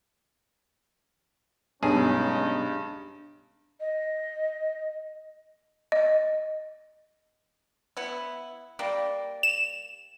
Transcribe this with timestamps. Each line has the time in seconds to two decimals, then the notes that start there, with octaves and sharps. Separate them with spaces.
1.83 B1 G2 G#3 C#4 D#4 G#4
3.80 D#5
5.92 D#5
7.97 B3 E4
8.79 G3 A#3
9.43 E7